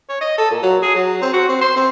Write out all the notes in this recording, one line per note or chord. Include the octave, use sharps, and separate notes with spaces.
C#5
D#5
A4
A#2
F#3
G#4
F#3
C4
F#4
C4
C5
C4